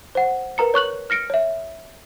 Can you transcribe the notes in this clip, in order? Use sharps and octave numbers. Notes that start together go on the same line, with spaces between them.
C5 F#5
A#4 B4 A#5 C#7
C#5 C#6 F#6 F#7
F6 A#6 C#7 D7
C#5 E5